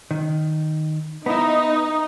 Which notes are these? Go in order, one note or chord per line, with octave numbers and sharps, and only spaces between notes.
D#3
B3 D#4 E4